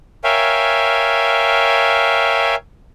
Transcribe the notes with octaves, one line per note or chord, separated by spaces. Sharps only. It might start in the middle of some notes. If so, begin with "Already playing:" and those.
A#4 C#5 E5 F5 G5 G#5